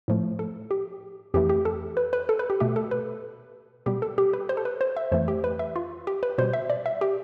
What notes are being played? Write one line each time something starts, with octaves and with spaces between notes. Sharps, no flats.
A2 F3 A3
A4
G4
F2 E3 A3 G4
G4
A4
B4
B4
A4
B4
G4
B2 A3 G4
A4
B4
B2 G3 G4
A4
G4
B4
C5
A4
B4
C5
E5
F2 E3 A3 C5
G4
B4
E5
F4
G4
B4
B2 G3 C5
E5
D5
E5
G4